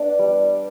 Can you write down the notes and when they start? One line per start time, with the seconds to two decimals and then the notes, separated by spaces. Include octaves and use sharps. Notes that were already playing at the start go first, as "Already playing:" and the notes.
Already playing: B3 D4
0.19 G3